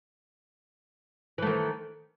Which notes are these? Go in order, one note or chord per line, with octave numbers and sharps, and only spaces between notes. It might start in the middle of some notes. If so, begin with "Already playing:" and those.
D#3 E3 A3